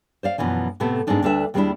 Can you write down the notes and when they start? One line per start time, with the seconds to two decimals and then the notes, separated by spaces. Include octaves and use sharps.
0.23 C5 D5 F5
0.38 F#2 B2 E3 F3
0.80 A2 C3 A3 B3 C4
1.07 G#2 G#3 B3 C4 D4 D#4
1.23 D2 G3 D4 A4 B4 E5
1.54 D#2 G3 G#3 C4 D4 E4